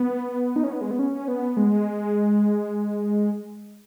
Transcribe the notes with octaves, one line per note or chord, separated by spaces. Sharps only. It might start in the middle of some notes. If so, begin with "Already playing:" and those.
Already playing: B3
D#4
C#4
B3
G#3
B3
C#4
B3
G#3